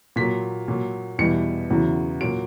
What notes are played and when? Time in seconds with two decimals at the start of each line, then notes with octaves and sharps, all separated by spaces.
0.16 A#2 F#3 B6
0.68 A#2 F#3
1.18 E2 B2 G3 C#7
1.70 E2 C#3 F#3
2.21 A#2 F#3 D7